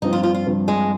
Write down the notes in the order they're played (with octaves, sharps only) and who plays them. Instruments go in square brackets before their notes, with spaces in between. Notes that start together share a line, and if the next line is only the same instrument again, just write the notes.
[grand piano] G2 F3 C4 [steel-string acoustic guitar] D#4
[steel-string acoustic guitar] F4
F4
F4
[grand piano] G2 F3 C4
[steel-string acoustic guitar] G#3